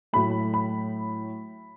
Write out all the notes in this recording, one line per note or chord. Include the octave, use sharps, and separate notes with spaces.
A2 F#3 A3 B5
B5